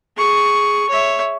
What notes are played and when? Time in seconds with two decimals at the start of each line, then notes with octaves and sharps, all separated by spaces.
0.17 G#4 C#6
0.89 C#5 E5